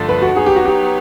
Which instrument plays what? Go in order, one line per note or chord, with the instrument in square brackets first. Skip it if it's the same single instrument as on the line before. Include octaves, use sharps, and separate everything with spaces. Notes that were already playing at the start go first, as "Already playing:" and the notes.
Already playing: [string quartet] G2 D3 F3 A3
[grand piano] B4
F#4
[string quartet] F#3 B3 D#4 [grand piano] G#4
[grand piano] G4
F#4
G4